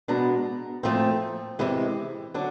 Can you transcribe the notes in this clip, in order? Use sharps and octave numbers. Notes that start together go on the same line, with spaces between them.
B2 G#3 B3 D4 A#5
A#2 F3 A3 C4
C3 E3 G#3
D3 F#3 D4